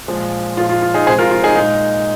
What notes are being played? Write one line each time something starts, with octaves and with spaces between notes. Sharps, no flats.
A#2 F3 G#3
A#2 F3 G#3 F4
F4
F4
D#4 G#4
C3 F3 G#3 G#4 C5
F4 A#4
F4
D#4 G#4
A#2 G#3 D#4